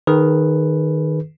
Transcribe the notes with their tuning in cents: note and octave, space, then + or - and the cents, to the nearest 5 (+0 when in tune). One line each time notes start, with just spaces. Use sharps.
D#3 -5 G#4 +30 B4 +0